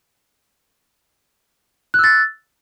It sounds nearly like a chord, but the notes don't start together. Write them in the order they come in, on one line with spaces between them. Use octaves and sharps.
F#6 E6 A6